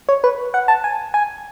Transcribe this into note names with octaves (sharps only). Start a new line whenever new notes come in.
C#5
B4
F#5
A5
G#5
G#5